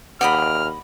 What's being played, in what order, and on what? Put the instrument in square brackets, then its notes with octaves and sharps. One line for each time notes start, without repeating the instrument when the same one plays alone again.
[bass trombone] D#2 [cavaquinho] D5 D#5 B5 [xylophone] F#5 [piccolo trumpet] F6